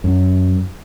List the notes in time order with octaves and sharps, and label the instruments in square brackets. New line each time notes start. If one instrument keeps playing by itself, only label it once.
[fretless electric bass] F#2